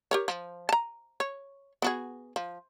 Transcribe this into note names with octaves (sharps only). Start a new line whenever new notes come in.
G4 A#4 C#5
F3
A5 A#5
C#5
B3 F#4 G#4
F3